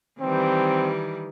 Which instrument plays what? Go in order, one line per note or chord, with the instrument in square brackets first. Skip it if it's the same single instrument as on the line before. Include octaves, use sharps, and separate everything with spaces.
[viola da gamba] D#3 E3 G3 [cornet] C4